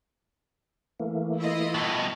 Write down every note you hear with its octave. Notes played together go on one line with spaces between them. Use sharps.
E3 A3 A#3
E4 F4 D#5
G2 B2